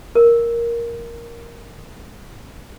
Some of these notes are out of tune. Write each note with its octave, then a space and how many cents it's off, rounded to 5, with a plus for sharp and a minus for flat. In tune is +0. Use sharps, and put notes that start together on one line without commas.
A#4 +5